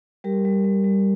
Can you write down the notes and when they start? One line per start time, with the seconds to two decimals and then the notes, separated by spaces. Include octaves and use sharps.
0.24 G3 G4 A#4
0.45 G3
0.64 G3
0.84 G3